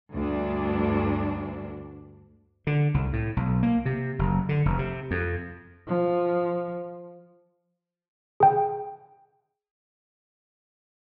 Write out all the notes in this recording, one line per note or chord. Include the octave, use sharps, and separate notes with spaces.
D2 G2 D4
D3
C2
A2
B1
A#3
C3
F#1
D3
F1
C3
F2
F3
G#4 G5